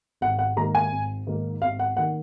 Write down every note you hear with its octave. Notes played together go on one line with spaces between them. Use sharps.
G#1 F#5
F#5
G#2 D#3 A#3 A#5
G#5
G#1
G#2 D#3 A#3
G#1 F5
F#5
D#3 A#3 F#5